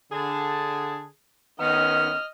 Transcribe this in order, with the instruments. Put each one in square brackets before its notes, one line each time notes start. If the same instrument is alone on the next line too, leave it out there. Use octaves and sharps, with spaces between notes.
[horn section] D3 G#4 A5
[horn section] D#3 B3 C#4 [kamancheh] D#5 F6